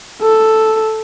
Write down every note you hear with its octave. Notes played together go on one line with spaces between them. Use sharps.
A4